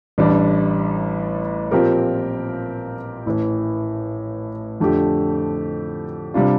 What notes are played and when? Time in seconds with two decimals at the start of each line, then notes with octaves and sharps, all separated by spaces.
0.18 A1 A2 G3 D4
1.71 A#2 F3 C4 G4 A#4
3.26 A1 A2 E3
4.80 F2 D3 A3 D4 G4
6.34 C3 G3 D4 F4